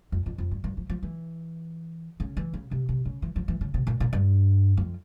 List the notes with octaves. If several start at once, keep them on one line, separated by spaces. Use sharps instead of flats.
F2
F2
F2
G2
G2
F3
F3
E3
C#3
E3
C#3
C3
C3
C#3
E3
F3
E3
C#3
C3
A#2
A#2
G2
F2